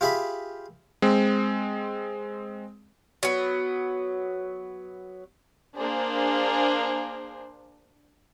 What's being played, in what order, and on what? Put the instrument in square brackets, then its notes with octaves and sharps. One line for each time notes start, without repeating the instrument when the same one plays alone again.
[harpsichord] F4 G4 G#4 E5 B5
[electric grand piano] G#3 C4
[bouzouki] F#3 B3
[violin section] A#3 D4 G#4 C5